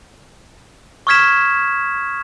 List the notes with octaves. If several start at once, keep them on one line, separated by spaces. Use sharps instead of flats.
C#6 D#6 F6 G#6 B6 E7